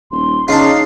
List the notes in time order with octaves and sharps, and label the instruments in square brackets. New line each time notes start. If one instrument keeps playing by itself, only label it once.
[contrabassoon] D#1 [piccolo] C6
[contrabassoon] C#3 [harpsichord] D4 F4 [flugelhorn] D#4 [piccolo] C7